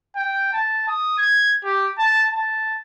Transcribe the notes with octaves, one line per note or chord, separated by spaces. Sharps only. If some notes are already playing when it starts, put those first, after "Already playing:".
G5
A5
D#6
G#6
G4
A5
A5